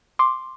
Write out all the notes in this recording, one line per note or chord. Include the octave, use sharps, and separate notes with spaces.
C6 D6